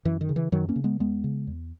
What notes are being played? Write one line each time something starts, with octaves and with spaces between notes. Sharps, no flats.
F#2 E3
D#3
C#3
E3
F#2 D#3 F#3
A#3 C#4
C#3
G#3 B3
E2 G#3 B3
C#3
E2